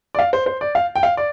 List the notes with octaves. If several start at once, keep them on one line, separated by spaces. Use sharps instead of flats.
D5
F5
C5
C5
D5
F5
G5
F5
D5